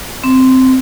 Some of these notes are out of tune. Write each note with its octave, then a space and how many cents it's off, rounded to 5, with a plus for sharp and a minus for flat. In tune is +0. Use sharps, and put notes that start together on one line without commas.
C4 -10